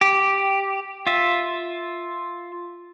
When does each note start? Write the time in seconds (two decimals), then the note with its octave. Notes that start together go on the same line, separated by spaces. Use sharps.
0.01 G4
1.07 F4 E5